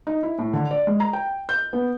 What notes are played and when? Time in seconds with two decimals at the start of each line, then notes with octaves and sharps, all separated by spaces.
0.07 D#4
0.23 E4
0.39 A2
0.53 D3
0.71 D5
0.87 G#3
1.00 A#5
1.13 G5
1.49 G6
1.73 B3